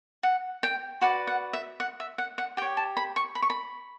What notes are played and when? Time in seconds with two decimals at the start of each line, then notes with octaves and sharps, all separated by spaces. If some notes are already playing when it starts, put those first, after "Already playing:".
0.23 F#5
0.63 G5
1.01 F#4 B4 D5 F#5
1.27 F#5
1.53 E5
1.80 F#5
2.00 E5
2.18 F#5
2.38 F#5
2.57 G4 G5
2.62 C#5
2.77 A5
2.97 B5
3.16 C#6
3.35 B5
3.42 C#6
3.50 B5